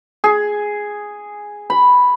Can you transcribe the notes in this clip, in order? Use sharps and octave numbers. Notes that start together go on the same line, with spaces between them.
G#4
B5